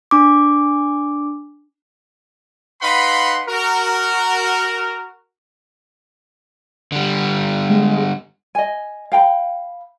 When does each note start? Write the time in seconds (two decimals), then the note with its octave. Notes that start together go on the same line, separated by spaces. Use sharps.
0.11 D4 D6
2.81 D#4 B4 F5 F#5 B5 C6
3.48 F#4 A#4
6.92 D3 G3
7.70 G#3
8.55 D#5 G#5
9.12 F5 G5 A#5 B5